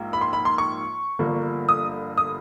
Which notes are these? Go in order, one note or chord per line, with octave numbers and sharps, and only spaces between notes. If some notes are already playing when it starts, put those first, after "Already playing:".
Already playing: A#1 G#2 A#3
B5
C6
B5
C6
C#6
G1 G2 D3 F3 A#3
D#6
D#6